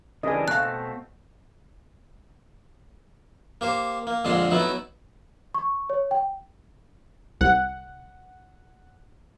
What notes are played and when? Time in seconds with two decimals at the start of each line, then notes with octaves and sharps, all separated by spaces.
0.23 C#3 E3 G3 C4 D4 A#4 D#5 G#5
0.48 B2 A3 C4 F5 A5 F#6
3.61 A#3 G4 C5
4.07 A#3
4.25 A#1 F2 D3 G#3 D4 C6
4.51 F#3 A3 B3 D#4 E4
5.54 C#6
5.90 C#5
6.11 G5
7.41 C2 F#5